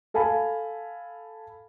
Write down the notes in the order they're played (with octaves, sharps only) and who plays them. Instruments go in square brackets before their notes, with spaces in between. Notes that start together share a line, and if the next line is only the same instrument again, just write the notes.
[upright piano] A4 F5 G#5 A5 B5